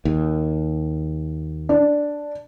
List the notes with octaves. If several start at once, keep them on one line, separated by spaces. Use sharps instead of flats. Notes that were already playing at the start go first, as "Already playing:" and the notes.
D#2
D4